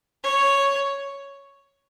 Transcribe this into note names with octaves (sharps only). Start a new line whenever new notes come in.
C#5